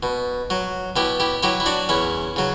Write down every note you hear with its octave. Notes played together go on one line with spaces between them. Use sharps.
B2
F#3
B2 E4 G4
E4 G4
F#3 E4 G4
E4
D4 F#4
E2 C#4 E4
C#3 F#3